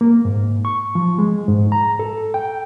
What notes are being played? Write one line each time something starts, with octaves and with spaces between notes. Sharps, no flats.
A#3
G#2
C#6
F3
G#3
G#2
A#5
A4
G5